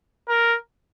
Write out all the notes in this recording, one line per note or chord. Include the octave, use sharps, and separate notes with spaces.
A#4